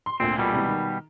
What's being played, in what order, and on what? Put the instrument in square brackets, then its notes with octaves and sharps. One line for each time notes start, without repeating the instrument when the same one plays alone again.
[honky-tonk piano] C6
[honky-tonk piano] D2 A#2 [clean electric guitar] C4
[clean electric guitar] B2 G3
[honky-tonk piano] C#2 C3 E3
D#3